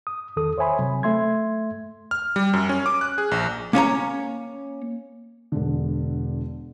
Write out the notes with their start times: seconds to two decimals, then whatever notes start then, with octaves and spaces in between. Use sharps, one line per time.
0.07 D#6
0.36 E2 D#3 A4 D#6
0.58 C5 C#5 E5 G#5 B5 C6
0.79 C3 F#3
1.03 A3 E5 C6 G#6
2.11 F6
2.36 G3
2.53 F#2
2.69 C#4
2.86 D6
3.01 F#6
3.18 G#4
3.31 A#1
3.73 A#3 C#4 C#5 A#5
5.52 E1 D3